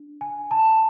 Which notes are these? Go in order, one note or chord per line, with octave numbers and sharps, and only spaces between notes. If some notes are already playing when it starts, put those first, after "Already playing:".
Already playing: D4
G#5
A5